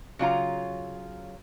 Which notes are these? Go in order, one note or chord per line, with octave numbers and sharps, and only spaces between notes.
C#3 F#3 F4 A#5